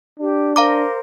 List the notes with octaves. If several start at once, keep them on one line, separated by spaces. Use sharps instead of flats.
D4 G4
A#4 C5 F5 A#5 D6